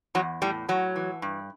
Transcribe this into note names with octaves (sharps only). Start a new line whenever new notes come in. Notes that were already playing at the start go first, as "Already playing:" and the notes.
E2 F#3
A2 G3
A2 F#3
E3
G2